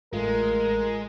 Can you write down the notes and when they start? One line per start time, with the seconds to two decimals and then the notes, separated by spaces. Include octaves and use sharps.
0.13 A1 G#3 A3 F4 A#4